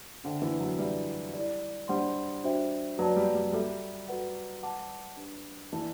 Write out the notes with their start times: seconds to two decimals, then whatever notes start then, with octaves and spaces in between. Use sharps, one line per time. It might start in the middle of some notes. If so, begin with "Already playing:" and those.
0.24 D3 D4 A4 C5 E5 G5
0.42 E3
0.60 F#3
0.78 G3 B4 E5 B5
1.34 E4 G4 D5
1.88 G3 D4 G4 C5 F#5 C6
2.44 D4 F#4 C5 E5 G5
2.98 F#3 F#4 B4 D5 A5
3.16 G3
3.35 G3
3.52 G3 F#4 A4 E5
4.08 F#4 B4 F#5
4.63 B4 F#5 A5 D6
5.17 D4 G4 B4
5.72 E3 B4 D5 A5